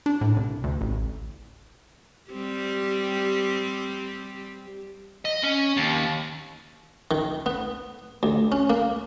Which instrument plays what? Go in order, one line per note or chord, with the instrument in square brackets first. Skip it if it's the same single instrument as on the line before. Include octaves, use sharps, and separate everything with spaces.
[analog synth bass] D4
A2
C2
D2
A1
[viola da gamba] G3 C4 G4
[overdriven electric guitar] D#5
C#4
D#2
[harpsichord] D#3
B3
D2
C#4
A#3